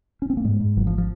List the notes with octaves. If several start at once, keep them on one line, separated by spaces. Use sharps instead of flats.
C#4
C4
A#3
G#2 G#3
G#2
G#1 F#3
F3
F3